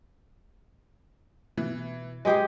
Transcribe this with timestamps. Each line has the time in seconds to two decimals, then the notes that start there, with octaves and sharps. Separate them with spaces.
1.58 B2 E3
2.25 G#3 G4 G#4 B4 D#5 G6